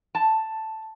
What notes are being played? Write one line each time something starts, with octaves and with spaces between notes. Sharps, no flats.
A5